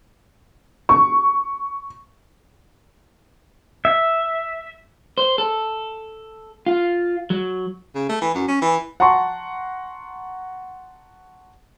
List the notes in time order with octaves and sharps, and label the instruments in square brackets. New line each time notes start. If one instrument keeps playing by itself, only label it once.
[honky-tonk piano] C#6
[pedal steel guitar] E5
[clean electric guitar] C5
A4
F4
F#3
[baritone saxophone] C#3
A3
E3
F#2
C#4
E3
[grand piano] F#5 A5 A#5 C6 C#6